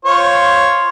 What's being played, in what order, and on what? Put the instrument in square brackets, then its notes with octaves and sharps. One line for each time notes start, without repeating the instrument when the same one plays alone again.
[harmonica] F4 C5 C#5